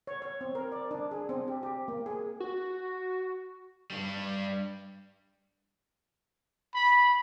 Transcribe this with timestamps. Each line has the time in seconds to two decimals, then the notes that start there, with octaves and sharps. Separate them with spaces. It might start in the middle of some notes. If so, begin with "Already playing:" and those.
0.07 C#5
0.22 C#5
0.41 C4
0.55 A#4
0.72 D5
0.91 D4
1.11 G#4
1.29 C4
1.48 G4
1.63 G4
1.88 A#3
2.06 G#4
2.40 F#4
3.90 G2 G3
6.74 B5